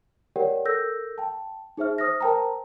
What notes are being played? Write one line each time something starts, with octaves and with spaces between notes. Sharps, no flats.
G4 A#4 C#5 D5 F#5 G5
A4 A#4 E6 G6 A#6
G5 A5
D#4 G#4 C5 E5 F6
C5 D#6 F6 A#6
A#4 C5 G5 A5 A#5